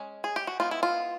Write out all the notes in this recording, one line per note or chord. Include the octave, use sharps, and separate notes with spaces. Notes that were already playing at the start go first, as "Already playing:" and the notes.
Already playing: G#3 C#4
G#4
G4
F#4
G#3 B3 D#4 F4
E4
F4